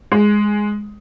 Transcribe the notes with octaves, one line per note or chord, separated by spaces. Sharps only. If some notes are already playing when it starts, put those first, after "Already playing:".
G#3